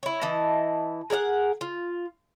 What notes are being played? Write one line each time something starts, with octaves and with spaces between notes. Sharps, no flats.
E4 C#5
E3 E4 D#5 A5
G#4 A#4 D5 F#5
F4